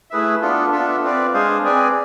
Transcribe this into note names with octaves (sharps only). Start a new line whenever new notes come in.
A3 E4 G#4 B4 E5
B3 D4 F4 A4
B3 D4 F4 A4 E5
C4 F4 B4 D5
G#3 D4 G#4 C5 F5
C4 G#4 B4 D5 G#5